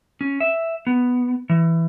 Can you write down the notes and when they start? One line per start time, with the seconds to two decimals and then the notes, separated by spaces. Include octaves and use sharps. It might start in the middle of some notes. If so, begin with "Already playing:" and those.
0.21 C#4
0.40 E5
0.87 B3
1.50 E3